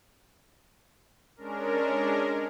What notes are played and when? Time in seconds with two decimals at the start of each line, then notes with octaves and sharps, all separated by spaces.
1.36 G#3 C#4 D4 A#4